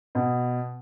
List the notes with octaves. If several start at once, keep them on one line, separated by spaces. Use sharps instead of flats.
B2